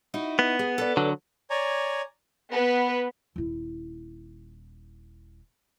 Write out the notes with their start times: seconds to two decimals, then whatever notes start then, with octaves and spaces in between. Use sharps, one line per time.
0.14 D#4 E4 F#4
0.39 B3
0.59 G#4
0.78 A4 B4 D5
0.97 D3 F#3
1.50 C#5 D5 G#5 A#5
2.53 B3 B4
3.36 D#1 E4